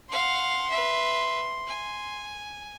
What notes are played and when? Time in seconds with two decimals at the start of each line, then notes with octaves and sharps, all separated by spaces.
0.11 F5 F#5 C6
0.70 B4 E5
1.67 G#5